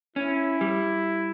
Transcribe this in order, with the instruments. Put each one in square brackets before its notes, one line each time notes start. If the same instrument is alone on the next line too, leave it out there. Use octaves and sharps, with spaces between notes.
[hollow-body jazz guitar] C#4 [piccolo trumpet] E4
[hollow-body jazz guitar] G3